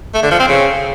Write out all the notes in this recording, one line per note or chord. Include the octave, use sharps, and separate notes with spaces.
A3
D3
F3
C4
C#3